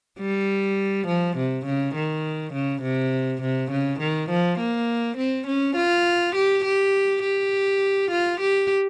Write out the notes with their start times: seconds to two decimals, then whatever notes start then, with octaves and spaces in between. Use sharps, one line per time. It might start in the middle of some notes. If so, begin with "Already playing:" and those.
0.19 G3
1.07 F3
1.37 C3
1.65 C#3
1.95 D#3
2.53 C#3
2.83 C3
3.42 C3
3.71 C#3
4.00 D#3
4.30 F3
4.59 A#3
5.17 C4
5.47 C#4
5.76 F4
6.36 G4
6.65 G4
7.23 G4
8.11 F4
8.40 G4